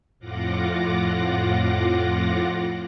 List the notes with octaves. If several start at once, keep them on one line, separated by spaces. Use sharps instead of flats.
F2 A2 F4 F#5 D6 A#6